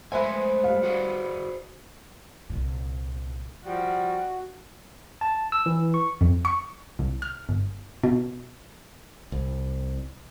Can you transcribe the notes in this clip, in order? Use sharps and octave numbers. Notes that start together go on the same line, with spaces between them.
G#3 A3 B4 C5 E5 G#5
G3 F5
F#4 G#4 D5
C2 A#2
F3 G3 F#4
A5
E6
E3
C#6
F2
C#6
C2
F6
G1
B2
C2